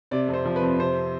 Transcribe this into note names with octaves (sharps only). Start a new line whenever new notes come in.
C3 D5
F2
C5
F3
B4
F2
C3 C5